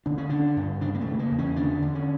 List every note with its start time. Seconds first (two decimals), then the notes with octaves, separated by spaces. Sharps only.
0.06 D3 D4
0.18 C#4
0.29 D3 D4
0.57 G2
0.81 C#3 D4
0.95 A#3
1.01 A3
1.06 C#3
1.19 A#3
1.32 E2
1.39 C#4
1.56 D3 D4
1.82 D3
1.95 C#4